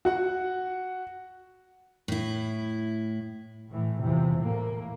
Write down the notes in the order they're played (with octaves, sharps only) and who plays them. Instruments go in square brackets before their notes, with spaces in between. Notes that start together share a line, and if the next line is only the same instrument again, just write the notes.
[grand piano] F#4 F#5
[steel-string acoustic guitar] A2 E4
[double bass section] A2 E3
E2 C3 E3 F3
A2 A#3